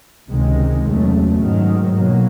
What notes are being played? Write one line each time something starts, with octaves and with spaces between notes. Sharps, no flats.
C#2 C3 D#3 G#3
E2 C#3 F#3 A3
G#2 D#3 F#3
B2 F#3 A#3